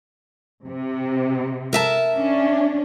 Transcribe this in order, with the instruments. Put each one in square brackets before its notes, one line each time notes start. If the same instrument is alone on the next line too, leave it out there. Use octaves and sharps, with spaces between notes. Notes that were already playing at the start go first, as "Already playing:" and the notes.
[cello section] C3
[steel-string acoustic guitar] A#4 E5 A5
[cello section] C#4 D4